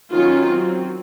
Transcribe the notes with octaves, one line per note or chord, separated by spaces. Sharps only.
D#3 F#3 C#4 F4
F#3 C4